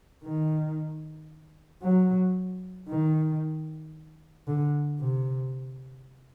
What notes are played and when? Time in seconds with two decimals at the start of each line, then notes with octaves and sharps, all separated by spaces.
0.24 D#3
1.82 F#3
2.88 D#3
4.47 D3
5.00 C3